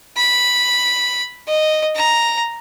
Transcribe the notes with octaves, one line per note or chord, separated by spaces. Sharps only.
B5
D#5
A#5